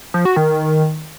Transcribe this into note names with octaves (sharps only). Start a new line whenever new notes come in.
F3
F#4
D#3